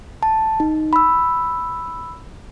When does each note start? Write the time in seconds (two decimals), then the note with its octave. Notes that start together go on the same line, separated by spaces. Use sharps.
0.23 A5
0.60 D#4
0.93 B5 E6